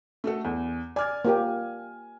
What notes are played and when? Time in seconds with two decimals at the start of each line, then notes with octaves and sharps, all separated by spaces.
0.24 A3 F#4 A4
0.45 E2
0.96 D5 G#5 F6 G#6
1.25 A#3 F4 G4